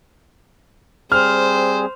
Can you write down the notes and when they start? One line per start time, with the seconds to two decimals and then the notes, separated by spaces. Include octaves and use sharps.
1.12 G3 C4 G#4 C5 F6